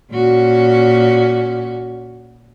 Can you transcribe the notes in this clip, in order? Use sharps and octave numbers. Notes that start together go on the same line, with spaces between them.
A#2 C#4 F#4